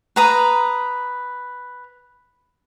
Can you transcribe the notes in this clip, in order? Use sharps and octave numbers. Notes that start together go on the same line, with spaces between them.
B4 A#5 D#6